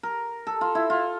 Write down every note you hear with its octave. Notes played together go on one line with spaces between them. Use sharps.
A#4
A4
F4
E4
F4